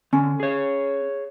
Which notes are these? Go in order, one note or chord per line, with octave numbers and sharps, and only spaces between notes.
D3 C#4
G#4 C#5